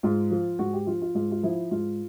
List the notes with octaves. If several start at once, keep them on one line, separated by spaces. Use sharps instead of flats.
G#2 F4
F3
G#2 F#4
G4
F3 F4
F4
G#2 F4
F4
F3 E4
G#2 F4